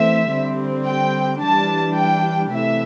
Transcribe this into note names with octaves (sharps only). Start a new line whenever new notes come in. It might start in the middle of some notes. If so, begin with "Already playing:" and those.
Already playing: E3 A3 C4 E5
D3 G3 C4
G5
E3 G3 D4 A5
G5
C3 E3 A3 E5